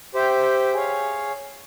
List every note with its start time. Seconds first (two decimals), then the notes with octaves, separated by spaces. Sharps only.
0.14 G4 C5 E5 G5
0.73 G#4 C#5 F5